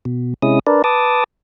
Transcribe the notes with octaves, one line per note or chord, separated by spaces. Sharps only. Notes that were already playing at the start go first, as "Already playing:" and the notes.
B2
C3 G#3 C#4 E4 D#6
D4 A#4 B4 D5
B4 A5 D6 D#6